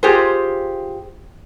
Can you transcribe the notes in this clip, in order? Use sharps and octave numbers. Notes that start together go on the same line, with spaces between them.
F4 G4 G#4 C5